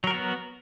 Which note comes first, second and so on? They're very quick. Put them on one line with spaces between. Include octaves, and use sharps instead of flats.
F#3 A#4 F#4 B3